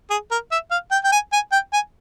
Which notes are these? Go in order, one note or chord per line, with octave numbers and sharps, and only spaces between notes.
G#4
A#4
E5
F5
G5
G5
G#5
G#5
G5
G#5